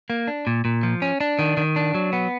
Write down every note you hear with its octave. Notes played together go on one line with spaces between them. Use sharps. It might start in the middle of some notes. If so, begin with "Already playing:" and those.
A#3
D4
A#2
A#2
F3
C#4
D4
D#3
D#3
D4
F#3
B3